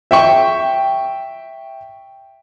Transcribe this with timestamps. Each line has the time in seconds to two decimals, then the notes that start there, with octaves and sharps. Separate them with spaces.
0.11 E5 G5 C#6